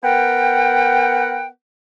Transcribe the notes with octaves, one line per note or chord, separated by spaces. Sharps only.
B3 A#4 F#5 G5